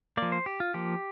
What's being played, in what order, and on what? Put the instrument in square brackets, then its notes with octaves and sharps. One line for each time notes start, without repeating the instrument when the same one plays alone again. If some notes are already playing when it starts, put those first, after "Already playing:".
[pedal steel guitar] F3 A#3 D5
C5
G4
F4
F3 A#3 G4